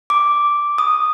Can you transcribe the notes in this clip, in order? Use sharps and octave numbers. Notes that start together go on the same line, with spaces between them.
D6
D#6